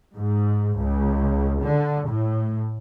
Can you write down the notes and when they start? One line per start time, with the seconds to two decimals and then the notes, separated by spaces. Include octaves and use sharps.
0.15 G#2
0.77 C#2
1.62 D3
2.07 A2